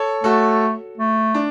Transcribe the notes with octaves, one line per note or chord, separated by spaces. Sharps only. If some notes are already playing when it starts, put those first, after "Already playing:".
Already playing: A4 C#5
A3 F#4 A4
A3
D4